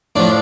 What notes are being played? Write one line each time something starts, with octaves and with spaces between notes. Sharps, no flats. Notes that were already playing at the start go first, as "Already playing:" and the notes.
A2 F3 D4